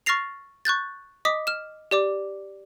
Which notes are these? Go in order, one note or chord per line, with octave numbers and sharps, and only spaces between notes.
C#6 F6 A6 A#6 C7 F7
C#6 F#6 G6 A6
D#5 D6 D#6 B6
F6 E7
G4 D5 D6